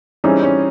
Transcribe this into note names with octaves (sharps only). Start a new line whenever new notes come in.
E3 G3 C4 C#4 D#4 G#4
C#4